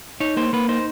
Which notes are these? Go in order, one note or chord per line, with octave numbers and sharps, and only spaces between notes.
D#4 C#5
A#3 C5
A#3 B4
D#4 C5